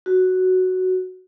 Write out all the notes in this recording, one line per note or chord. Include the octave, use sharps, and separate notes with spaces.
F#4